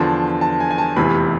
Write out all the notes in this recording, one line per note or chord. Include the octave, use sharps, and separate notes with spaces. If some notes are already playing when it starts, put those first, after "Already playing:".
Already playing: E2 D3 F3 A5
A5
G#5
G#5
A5
F1 E2 C3 E3 B5